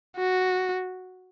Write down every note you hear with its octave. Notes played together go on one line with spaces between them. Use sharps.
F#4